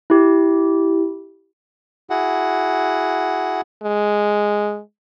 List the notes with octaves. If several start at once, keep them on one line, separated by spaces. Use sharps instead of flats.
E4 G4
E4 F#4 G#4 F#5
G#3